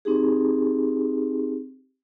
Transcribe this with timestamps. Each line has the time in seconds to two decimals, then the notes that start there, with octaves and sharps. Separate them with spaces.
0.05 C4 D#4 G4 G#4